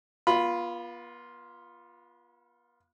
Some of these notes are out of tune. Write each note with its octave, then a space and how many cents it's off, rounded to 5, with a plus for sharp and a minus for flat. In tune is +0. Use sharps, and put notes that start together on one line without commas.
B3 -40 F4 +0 B5 +0